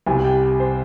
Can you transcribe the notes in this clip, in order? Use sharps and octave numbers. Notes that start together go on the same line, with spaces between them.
C2 C3 G3 G#5
G5
C5